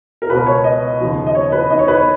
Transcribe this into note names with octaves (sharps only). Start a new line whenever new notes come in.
A#4
C#2 B2 B4
C#5
D#5
D#2 C#3 F3
D#5
C#5
B4
D#2 D#3 D#5
C#5
B4
C#5